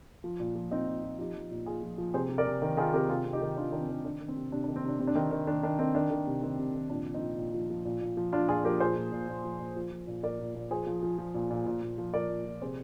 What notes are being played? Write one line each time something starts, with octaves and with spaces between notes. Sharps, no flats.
F3
A#2
F3
F3 C4 D#4
A#2
A#2
F3 D#4 G4
F3
A#2
A#2 F4 G#4
F3
F3
C3 G#4 C5
C3
A#4 D5
C3
D#3
D#3 F4 G#4
C3 G4 A#4
C3 F4 G#4
C3
D#4 G4
D#3
D#3 D4 F4
D#3 D4
C4
D#3 D4
D#3 D4
D#3
C4
C3
C3 D4
D4
D#3
C4
C3 D4
C3 C4
D4
D#3 C4
D#3
D#3 D4
D#3 D4
D#3 C4 D#4
D#3 D4
D#3
C3
D#3 C4
C3
D#3
A#2 D4
F3
C4 D#4
A#2
A#2
F3
F3
A#2
A#2
F3
F3 D4 F4
A#2 F4 G#4
F3 G4 A#4
A#2 G#4 C5
A#2
A#2
A#2
F3
A#2
F3
F3
A#2
A#2 A#4 D5
A#2
A#2
F3 G#4 C5
F3
F3
F3
A#2
A#2
A#2
A#2
F3
F3 A#4 D5
A#2
A#2
C3 G#4 C5